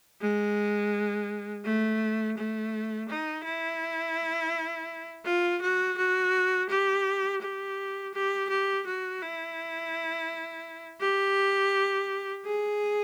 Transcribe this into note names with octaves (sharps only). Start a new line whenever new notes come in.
G#3
A3
A3
D#4
E4
F4
F#4
F#4
G4
G4
G4
G4
F#4
E4
G4
G#4